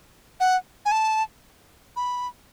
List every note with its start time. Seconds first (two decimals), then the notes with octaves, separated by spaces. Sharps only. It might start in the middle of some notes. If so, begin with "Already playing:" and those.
0.40 F#5
0.86 G#5
0.92 A5
1.96 B5